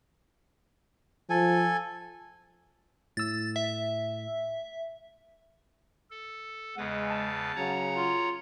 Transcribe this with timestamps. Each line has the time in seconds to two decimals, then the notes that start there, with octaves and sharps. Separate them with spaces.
1.30 F3 A4 G#5
3.17 A2 E6 A6
3.56 E5
6.11 A4
6.77 E2 C#3 G#3 B4 F#5
7.10 A5
7.56 C#3 F#3 C#5 F#5 A#5
7.96 F4